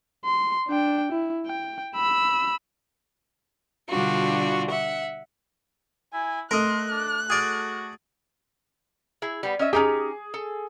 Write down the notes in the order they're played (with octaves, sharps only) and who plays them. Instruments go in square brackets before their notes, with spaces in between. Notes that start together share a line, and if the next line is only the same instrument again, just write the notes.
[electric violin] C6
D4 G5
E4
G5
B5 E6
[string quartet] B2 D3 G3 D4 F4 F#4
E5 F#5
[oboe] E4 [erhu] G#5
[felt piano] A3 [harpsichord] A#4 D#5 [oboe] C6 [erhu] F#6
[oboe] D4
[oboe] F#4 [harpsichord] G#4 D5
[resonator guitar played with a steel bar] E4 G#4
G3 B3
C#4 D#5 E5
[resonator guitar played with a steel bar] C#4 D#4 G4 [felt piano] G#4
[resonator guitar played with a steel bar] A4